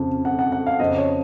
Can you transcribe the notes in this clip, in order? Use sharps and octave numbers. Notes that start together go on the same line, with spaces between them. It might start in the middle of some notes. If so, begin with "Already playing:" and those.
Already playing: F2 C#3
F#5
F#5
F#5
F5
F2 C#3 D#5
C#5